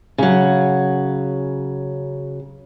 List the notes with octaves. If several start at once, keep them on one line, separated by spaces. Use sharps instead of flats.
C#3 F#3